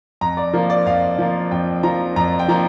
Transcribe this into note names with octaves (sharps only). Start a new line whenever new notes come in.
F2 A#5
D5
F3 A#3 A#4
D5
F2 F5
F3 A#3
F2 G5
F3 A#3 A#5
F2 A#5
G5
F3 A#3 A#5